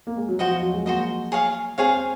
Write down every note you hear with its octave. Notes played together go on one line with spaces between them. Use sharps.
A#3
G#3
F#3
F3 F#4 C5 D#5
F3
F#3
G#3
A#3 F#4 C5 D#5
G#4 C#5 F5
C4 G#4 C#5 F5